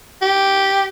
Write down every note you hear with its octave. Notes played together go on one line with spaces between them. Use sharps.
G4